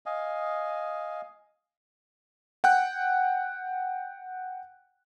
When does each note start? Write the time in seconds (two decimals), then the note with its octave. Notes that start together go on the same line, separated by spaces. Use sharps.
0.06 D#5 F5 G#5
2.64 F#5 G5 F#6